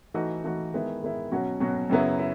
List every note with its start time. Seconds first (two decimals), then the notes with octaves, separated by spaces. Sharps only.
0.14 E3 A3 D#4 F#4
0.44 E3 A3 D#4 F#4
0.73 D#3 G#3 B3 E4
1.03 D#3 G#3 B3 E4
1.32 B2 F#3 C#4 F#4
1.60 B2 F#3 C#4 F#4
1.90 F#2 C#3 F#3 B3 E4
2.19 E4